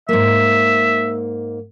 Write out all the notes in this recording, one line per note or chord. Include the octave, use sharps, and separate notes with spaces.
G#2 A#3 E5